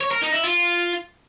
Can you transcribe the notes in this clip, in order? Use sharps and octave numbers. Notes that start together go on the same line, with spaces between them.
C#5
A#4
D#4
E4
F4